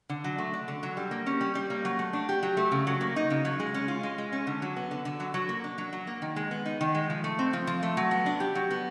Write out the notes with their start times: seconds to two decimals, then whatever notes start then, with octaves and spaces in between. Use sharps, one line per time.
0.09 D3
0.24 F#3
0.38 A3
0.54 D4
0.68 D3
0.83 F#3
0.97 G3
1.11 A#3
1.26 C#4
1.41 G3
1.55 G3
1.70 A#3
1.85 F#3
1.99 A3
2.13 D4
2.29 G4
2.43 F#3
2.57 A3
2.72 C#3
2.87 F#3
3.01 A#3
3.16 D#4
3.30 C#3
3.45 F#3
3.60 G#3
3.74 C#4
3.88 F4
4.03 G#3
4.18 G#3
4.32 C#4
4.47 D3
4.62 F#3
4.76 B3
4.91 D3
5.05 D3
5.20 F#3
5.34 F#3
5.49 A#3
5.64 D4
5.78 F#3
5.93 F#3
6.07 A#3
6.22 D#3
6.36 G#3
6.51 B3
6.66 D#4
6.81 D#3
6.95 G#3
7.10 F3
7.24 A3
7.39 C4
7.53 F3
7.67 F3
7.83 A3
7.97 F#3
8.11 B3
8.26 D4
8.40 G4
8.55 F#3
8.71 B3